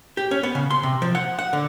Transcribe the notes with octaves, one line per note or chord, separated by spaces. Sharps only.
G4
C#4
B3
C#3
C6
C3
F3
F#5
F#5
D3